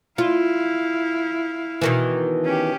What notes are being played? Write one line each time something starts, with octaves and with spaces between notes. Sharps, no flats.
E4 F4 F5
B2 D#3 E3
C#4 G4